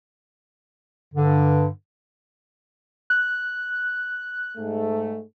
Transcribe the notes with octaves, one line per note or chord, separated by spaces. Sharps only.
G2 D3
F#6
G#2 A3